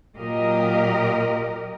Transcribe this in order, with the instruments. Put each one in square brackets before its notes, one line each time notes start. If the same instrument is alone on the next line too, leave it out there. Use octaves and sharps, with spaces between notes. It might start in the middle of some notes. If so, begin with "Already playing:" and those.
[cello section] A#2 F#3 G4 A#4 D#5